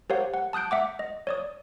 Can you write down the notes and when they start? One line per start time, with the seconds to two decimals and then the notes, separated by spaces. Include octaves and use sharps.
0.10 G4 A#4 C5 C#5 F5 F#5
0.34 F#5
0.53 A5 D#6 F#6 G6 D7
0.71 E5 F#5 D6
0.99 D#5
1.27 C#5 D5 D#6